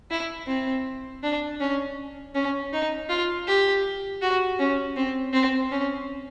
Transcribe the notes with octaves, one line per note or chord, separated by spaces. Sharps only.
E4
C4
D4
C#4
C#4
D#4
F4
G4
F#4
C#4
C4
C4
C#4